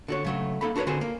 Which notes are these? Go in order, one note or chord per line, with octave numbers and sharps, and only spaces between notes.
D3 F#4 C#5
C#3 F#3 A3
A#3 D#4 A4 F#5 B5
D4 F#4 A#4 B4 C#5
D3 C4 F#4 G#4 A4 C5
A#3